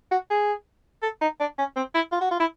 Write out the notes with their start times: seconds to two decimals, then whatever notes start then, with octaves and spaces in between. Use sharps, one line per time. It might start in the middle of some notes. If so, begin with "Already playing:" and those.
0.11 F#4
0.30 G#4
1.03 A4
1.21 D#4
1.40 D4
1.58 C#4
1.76 C4
1.95 E4
2.12 F4
2.21 F#4
2.31 F4
2.40 E4